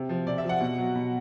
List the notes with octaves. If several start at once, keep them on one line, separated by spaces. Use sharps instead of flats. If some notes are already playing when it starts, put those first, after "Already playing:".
Already playing: C3
F3
C3 D5
E5
F3
F#5
B2
F#3
B2